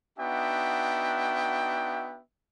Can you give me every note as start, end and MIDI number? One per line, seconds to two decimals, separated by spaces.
0.18 2.21 59
0.18 2.21 62
0.18 2.21 63
0.18 2.21 66
0.18 2.21 76
0.18 2.21 79